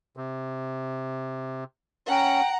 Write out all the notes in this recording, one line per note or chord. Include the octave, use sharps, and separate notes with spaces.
C3
C#4 F#5 G5 A#5